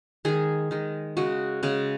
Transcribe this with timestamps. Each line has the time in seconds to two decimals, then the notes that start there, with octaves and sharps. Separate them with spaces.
0.25 D#3 G#3 G#4
0.71 D#3 G#3
1.17 C#3 G#3 F#4
1.63 C#3 G#3